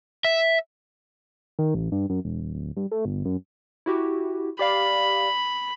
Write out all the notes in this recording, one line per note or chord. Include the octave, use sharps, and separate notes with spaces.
E5
D#3
A1
G2
F#2
E1
D#1
D1
G2
A3
G1
F#2
E4 F#4 G4
G4 D5 F5 B5